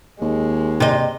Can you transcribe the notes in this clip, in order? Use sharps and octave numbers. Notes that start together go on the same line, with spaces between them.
D#2 G#3
C3 D#5